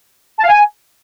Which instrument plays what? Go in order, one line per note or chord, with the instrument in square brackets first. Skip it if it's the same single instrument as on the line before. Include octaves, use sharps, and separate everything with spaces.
[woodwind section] A5
F5
G#5